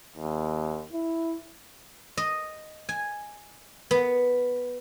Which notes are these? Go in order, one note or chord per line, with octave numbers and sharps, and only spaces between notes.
D#2
E4
D#5
G#5
B3